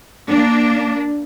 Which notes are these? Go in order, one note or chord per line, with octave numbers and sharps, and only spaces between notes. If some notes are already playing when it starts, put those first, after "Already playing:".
A#3 D4